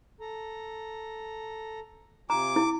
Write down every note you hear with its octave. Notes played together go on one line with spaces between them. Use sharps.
A4 A#5
C3 F4 G#5 A#5 D6
E4